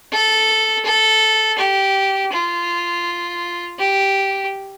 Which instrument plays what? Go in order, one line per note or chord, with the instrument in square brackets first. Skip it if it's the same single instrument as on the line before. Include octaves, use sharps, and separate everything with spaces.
[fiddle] A4
A4
G4
F4
G4